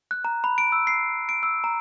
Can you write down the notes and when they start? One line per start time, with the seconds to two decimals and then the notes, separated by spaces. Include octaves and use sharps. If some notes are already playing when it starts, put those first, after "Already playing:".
0.11 F#6
0.25 A#5
0.44 B5
0.58 D7
0.72 E6
0.87 C7
1.29 D7
1.43 E6
1.64 A#5